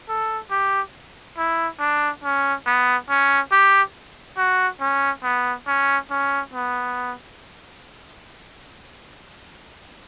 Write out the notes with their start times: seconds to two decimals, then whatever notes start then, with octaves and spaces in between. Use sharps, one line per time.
0.09 A4
0.51 G4
1.38 E4
1.80 D4
2.24 C#4
2.66 B3
3.09 C#4
3.52 G4
4.38 F#4
4.81 C#4
5.24 B3
5.67 C#4
6.11 C#4
6.53 B3